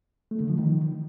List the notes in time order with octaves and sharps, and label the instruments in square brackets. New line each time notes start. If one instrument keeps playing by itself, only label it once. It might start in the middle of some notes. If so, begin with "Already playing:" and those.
[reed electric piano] A3
D3
F3
D#3